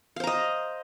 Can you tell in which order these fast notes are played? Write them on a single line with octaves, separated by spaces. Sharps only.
F5 C5 A#5 D#5